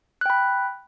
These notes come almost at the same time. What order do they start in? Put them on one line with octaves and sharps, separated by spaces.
F#6 G5 B5